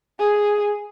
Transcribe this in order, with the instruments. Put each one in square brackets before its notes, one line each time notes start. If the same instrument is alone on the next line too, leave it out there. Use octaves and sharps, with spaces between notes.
[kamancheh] G#4